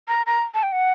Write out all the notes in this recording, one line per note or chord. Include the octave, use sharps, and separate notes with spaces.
A#5
A#5
A5
G5
F#5